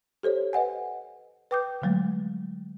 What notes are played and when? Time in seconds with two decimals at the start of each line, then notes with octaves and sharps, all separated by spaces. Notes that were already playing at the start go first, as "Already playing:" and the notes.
0.23 G4 A4 C5 C#5
0.53 B4 D#5 F#5 G#5
1.51 B4 G5 D6 D#6 G6
1.82 D3 F3 F#3 G#3 A3